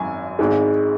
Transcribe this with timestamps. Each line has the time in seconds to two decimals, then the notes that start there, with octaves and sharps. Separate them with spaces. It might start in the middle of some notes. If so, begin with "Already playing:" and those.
Already playing: G#1 F#2 G#5
0.39 G#1 G#2 G#3